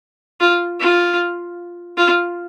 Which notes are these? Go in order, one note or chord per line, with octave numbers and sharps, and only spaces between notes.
F4
F4
F4